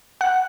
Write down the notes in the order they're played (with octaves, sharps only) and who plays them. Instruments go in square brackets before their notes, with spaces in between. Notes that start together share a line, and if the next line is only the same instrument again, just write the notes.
[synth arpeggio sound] F#5